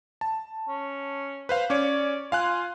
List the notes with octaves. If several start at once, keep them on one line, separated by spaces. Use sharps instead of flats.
A5
C#4
B4 C5 F5
C#4 C#5 D5
F4 F5 G#5 F#6